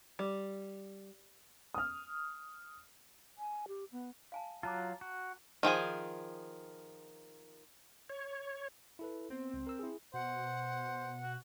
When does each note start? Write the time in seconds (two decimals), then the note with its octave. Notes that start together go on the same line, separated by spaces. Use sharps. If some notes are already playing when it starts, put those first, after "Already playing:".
0.19 G3
1.74 D#6 F6
3.38 G#5
3.68 G4
3.92 B3
4.32 F5 G#5 A5
4.63 F#3 F4 A5 A#5 D6
5.01 F#4
5.63 D#3 F3 G#4 G#5
8.10 C#5
8.99 E4 A4 B4
9.30 B3 C4
9.54 C#2
9.67 A#4 E6
9.79 E4 G#4
10.14 B2 C5 F#5
11.23 F#4